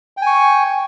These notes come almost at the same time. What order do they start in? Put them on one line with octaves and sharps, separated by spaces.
G5 G#5 C#6